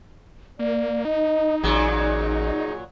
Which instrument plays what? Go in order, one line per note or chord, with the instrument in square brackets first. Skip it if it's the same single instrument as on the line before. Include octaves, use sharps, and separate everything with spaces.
[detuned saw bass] A#3 [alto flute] D5
[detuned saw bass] D#4 [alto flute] D#5
[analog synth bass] A1 [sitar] A#2 F#3 [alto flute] G#4